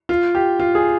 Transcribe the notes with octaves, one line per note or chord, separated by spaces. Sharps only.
F4
G4
F4
G#4